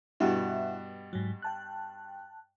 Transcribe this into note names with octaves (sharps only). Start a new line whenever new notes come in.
G2 B2 E4 E5 F#5
G#2 F#3
G5 A5 F#6